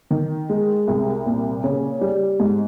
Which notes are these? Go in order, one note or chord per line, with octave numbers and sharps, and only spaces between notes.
D#3
G#3
C2
A#2
C#3
G3
G#2